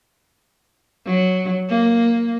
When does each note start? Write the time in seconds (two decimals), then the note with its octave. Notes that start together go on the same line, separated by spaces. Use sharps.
1.06 F#3
1.69 A#3